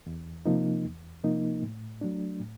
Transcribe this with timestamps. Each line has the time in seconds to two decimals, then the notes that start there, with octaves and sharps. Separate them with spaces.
0.06 E2
0.46 C3 F3 A#3 D#4
0.85 E2
1.24 C3 F3 A#3 D#4
1.62 A2
2.01 F#3 A3 D4
2.40 A2